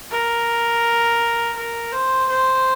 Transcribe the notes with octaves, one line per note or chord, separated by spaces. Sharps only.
A#4
A#4
C5
C5